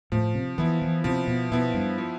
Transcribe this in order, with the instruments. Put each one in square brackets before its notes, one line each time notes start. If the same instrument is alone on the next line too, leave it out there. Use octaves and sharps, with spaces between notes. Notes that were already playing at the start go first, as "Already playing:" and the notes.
[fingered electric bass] A2 [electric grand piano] F3
[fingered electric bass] C3
[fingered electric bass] E3 [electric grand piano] B3 E4
[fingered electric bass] E3
[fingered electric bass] C3 [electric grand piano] F3
[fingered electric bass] B2
[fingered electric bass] B2 [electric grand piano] B3 E4
[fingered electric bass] G2
[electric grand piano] F3